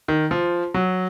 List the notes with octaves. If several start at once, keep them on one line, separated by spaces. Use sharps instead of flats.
D#3
F3
F#3